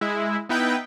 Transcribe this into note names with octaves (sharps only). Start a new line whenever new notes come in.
G#3 E4
B3 D#4 E4 B4 G5